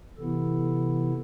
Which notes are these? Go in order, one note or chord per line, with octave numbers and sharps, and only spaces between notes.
C3 E3 B3 E4 A4